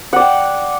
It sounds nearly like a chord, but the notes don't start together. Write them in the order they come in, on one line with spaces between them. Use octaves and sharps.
F#5 D5 G5